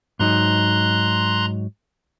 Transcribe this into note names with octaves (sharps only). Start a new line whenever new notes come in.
G#2 F#3 D#4 A#5 C6 F#6